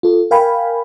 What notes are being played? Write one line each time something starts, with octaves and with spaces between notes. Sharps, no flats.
F4 A4
A#4 F5 G5 G#5 B5